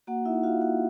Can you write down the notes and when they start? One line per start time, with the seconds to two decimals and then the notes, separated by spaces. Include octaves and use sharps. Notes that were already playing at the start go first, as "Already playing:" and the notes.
0.07 A#3 F#4 F#5
0.25 D#4 E4 E5
0.43 F4 F#4 F5
0.61 A#3 F#4 F#5